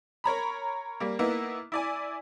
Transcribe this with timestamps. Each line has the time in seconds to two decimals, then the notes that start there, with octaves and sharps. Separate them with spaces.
0.24 A#4 C#5 A#5 B5
1.00 G3 A#3
1.19 A#3 B3 D#4 E4
1.72 E4 D5 G#5